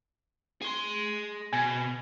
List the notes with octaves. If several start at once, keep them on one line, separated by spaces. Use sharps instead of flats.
G#4 C6
B2 G#5